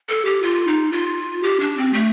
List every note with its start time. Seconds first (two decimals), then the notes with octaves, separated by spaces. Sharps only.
0.09 A4
0.25 G4
0.43 F4
0.68 D#4
0.92 F4
1.43 G4
1.60 D4
1.77 C4
1.93 A3